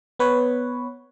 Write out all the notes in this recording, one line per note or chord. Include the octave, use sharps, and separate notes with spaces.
B3 B4 C#5